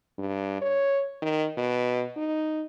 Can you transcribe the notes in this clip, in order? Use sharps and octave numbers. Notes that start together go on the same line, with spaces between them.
G2
C#5
D#3
B2
D#4